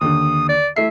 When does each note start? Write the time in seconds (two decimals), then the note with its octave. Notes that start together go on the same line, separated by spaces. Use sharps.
0.01 D#2 D3 D#6
0.49 D5
0.76 A3 E4 E5 C7